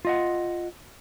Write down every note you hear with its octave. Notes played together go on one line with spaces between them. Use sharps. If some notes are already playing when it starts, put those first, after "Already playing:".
F4 D#5 F#5